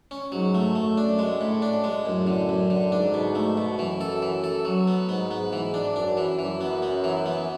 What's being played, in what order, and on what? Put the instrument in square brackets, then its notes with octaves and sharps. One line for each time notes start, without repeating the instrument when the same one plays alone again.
[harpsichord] C#4
[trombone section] G#2 [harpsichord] F#3
[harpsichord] A3
[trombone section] F#2 [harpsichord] A3
[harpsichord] D4
G#3
A2
D4
G#3
[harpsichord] F#2 [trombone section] A2
[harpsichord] D3
F#2
D3
[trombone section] G#2 [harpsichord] D4
[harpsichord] B2
A3
B2
[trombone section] F#2 [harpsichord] E3
[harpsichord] A4
E3
A4
F#3
B3
[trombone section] G#2 [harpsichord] B3
[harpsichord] B3
[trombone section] G#2 [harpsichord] E3
[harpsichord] D4
[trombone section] F#2 [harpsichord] D4
[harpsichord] E3
[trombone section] F#2 [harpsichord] E3
[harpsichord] B3
B3
E3
B3